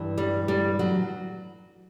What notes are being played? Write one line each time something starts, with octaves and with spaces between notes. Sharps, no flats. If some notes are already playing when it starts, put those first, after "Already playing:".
Already playing: G2 E3
G3
G3
F#3